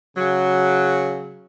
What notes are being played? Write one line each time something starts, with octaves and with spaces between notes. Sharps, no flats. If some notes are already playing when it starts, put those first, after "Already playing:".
C#3 F#3